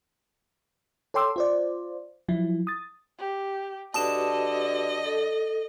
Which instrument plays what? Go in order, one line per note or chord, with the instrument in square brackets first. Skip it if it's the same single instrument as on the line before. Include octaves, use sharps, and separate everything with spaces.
[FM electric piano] A4 C#5 G5 C6 D6 E6
F4 C5 D5
F3 F#3 E4
D#6 A6
[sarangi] G4
[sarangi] D3 [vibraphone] F#4 G4 B4 [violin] D#5 [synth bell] A5 D#6 E7
[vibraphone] A4